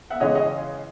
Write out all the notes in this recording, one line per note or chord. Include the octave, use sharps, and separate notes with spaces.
E5 F#5
C#3 E3 G#3 C#4 C#5 D#5
C#5 D#5